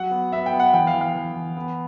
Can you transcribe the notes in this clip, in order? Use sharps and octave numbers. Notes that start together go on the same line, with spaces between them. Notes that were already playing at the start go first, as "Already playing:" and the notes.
Already playing: F#3 F#5
B3
B3 E5
G5
B3
F#5
E3 G5
F5
E3
F5
E3
E3
B3